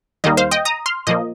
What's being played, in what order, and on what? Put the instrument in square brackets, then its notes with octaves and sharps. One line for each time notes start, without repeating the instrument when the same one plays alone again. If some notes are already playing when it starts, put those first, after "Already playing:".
[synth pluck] D#2 D#3 G3 A#3 D#5
C5 F5
D#5 G5
A#5 D#6
C6 F6
A#2 F3 A#3 D#5